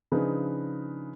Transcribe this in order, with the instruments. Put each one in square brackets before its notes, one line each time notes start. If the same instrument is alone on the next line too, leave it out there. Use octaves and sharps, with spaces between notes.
[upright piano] C#3 F3 D4 D#4 G#4 B4